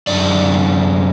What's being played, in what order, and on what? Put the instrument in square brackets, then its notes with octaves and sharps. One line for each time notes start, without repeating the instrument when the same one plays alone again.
[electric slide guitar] F#2 D3 D5